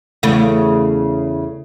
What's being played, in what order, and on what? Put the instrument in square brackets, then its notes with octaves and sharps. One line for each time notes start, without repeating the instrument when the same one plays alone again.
[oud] E2 C#3 A3